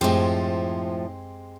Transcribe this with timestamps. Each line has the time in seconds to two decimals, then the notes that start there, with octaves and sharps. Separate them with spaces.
0.01 F#2 A2 F3 G#3 C4 G4